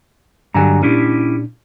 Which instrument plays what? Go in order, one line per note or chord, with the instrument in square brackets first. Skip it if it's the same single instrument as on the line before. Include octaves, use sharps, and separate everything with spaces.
[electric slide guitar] G2 D3 F#3 [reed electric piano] G4 G#5 A#5
[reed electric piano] A#2 D4 [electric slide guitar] C#4 E4 G4